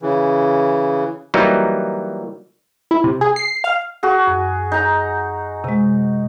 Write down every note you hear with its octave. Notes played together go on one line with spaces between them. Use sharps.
C#3 E3
E3 F#3 G3 A#3 D#4
E4
C3
G#4
C7
F5
F#4 G#4
F#2
D#4 A#5
C3 G#3